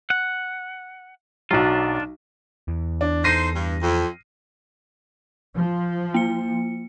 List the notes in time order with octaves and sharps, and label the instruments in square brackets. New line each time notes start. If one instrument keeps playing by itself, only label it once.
[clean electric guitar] F#5
[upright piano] B1 F#3 [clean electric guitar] D4 F4
[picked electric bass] E2
[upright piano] D4
[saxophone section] D#4 A4 C5 [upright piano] A#6 C7 D#7
[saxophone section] G2
F2
[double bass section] F3
[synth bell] A#3 C#7